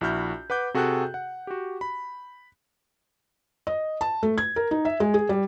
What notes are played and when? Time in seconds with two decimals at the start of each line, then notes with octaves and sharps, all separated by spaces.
0.01 A#1 E4 F#4 F6 G6
0.50 B4 F#5 D6 G6
0.74 C3 F#4 G#4 A4 G5 F#6
1.14 F#5
1.47 F#4 G4
1.81 B5
3.67 D#5
4.01 A5
4.23 A3
4.38 G#6
4.56 A#4
4.71 D#4
4.85 E5
5.00 G#3
5.14 G#4
5.29 G3